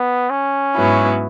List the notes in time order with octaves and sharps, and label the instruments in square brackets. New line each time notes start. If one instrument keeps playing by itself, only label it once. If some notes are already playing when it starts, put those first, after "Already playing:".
Already playing: [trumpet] B3
C#4
[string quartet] G#2 F#3 B3 E4